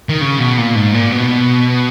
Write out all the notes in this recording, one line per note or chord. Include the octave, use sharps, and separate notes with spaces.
D#3
C#3
B2
A#2
G#2
A#2
B2